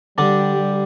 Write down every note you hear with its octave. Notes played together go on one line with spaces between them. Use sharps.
D3 G3 D4
G4
G3